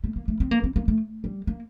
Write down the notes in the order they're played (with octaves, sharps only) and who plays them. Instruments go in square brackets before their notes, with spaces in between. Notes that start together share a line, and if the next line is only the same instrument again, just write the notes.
[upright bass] A3
A#3
A3
C4
A#3
C4
A#3
A3
G3
A#3